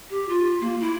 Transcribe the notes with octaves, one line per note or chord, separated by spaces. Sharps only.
G4
F4
A#3
E4